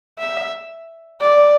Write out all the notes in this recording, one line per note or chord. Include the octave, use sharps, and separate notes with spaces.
E5
D5